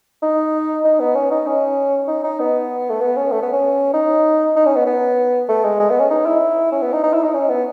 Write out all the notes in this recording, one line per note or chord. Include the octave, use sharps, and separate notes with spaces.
D#4
D#4
B3
C#4
D#4
C#4
D#4
D#4
B3
A3
B3
C#4
A3
B3
C#4
D#4
D#4
C#4
B3
B3
A3
G#3
G#3
B3
C#4
D#4
E4
C#4
B3
D#4
D#4
E4
D#4
C#4
B3